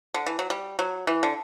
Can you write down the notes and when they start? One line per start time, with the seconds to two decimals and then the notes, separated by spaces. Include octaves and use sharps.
0.14 D3
0.26 E3
0.39 F#3
0.50 G3
0.79 F#3
1.07 E3
1.23 D3